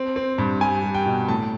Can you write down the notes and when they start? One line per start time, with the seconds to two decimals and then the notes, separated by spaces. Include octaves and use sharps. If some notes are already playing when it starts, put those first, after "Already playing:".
Already playing: C4
0.16 C4
0.38 G2
0.61 G3 G#5
0.83 G3
0.95 G5
1.06 B2
1.28 A2 A5